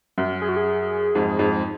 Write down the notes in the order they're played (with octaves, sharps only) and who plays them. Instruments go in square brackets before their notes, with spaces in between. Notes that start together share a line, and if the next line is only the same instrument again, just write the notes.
[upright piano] F#2
[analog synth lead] G#4
F#4
G#4
[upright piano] F2 G#2
F2 G#2